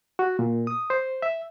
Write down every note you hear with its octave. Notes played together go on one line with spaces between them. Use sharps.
F#4
A#2
D#6
C5
E5